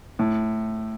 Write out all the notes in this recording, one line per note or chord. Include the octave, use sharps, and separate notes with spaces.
A2